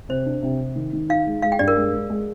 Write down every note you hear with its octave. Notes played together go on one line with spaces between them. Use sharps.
C3 C5
D4
C3
C3
D#3
D#3
D#4 F5
G#3
G#3 F5
G5
G2 D5
A#4
G#3
G#3
G#3